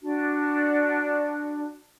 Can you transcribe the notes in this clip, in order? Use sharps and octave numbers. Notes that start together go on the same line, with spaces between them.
D4 F#4